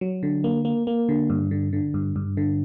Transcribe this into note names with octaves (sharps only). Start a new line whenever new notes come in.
F#3
D3
A#3
A#3
A#3
D3
G2
D3
D3
G2
G2
D3